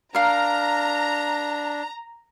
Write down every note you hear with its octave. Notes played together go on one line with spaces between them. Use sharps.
D4 A#4 F5 A#5